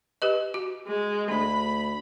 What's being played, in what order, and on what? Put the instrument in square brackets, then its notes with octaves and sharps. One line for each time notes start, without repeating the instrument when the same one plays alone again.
[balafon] G4 B4 D#5
F#4
[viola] G#3
[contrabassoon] D2 [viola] B5